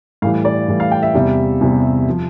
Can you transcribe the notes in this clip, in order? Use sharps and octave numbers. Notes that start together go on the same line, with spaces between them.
A2 E3 G3 F5
D5
A2 E3 G3
F5
G5
E5
E2 C3 G3
E2 C3 G3
F3